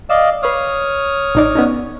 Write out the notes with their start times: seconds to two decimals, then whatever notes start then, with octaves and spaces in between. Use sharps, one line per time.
0.10 D5 D#5 F5 E6
0.43 B4 C#5 D#6 F6 C7
1.35 A1 D#4 D5
1.55 B3 C#4 D#4